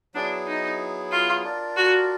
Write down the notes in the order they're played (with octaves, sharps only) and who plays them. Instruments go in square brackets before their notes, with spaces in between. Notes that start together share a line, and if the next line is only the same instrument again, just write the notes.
[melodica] F#3 B3 E4 G#4 [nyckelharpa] D4
[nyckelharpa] D#4
F4
[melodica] D4 F4 A#4 D5
[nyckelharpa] F#4